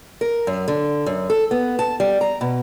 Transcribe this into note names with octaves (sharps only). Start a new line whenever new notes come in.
A#4
F#2
D3
F#2
A4
B3
A5
G3
A#5
B2